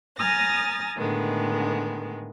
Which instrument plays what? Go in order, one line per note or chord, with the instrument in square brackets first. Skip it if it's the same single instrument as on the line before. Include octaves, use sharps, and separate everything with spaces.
[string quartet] G#5 A#5 D#6 F6 A6 A#6
A2 D3 D#3 G#3 B3